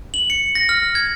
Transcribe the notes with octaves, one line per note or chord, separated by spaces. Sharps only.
F#7
C#7
A#6
F6
G#6